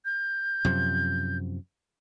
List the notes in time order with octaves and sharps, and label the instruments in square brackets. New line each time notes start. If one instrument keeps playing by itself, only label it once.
[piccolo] G6
[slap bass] F#2 C3 F3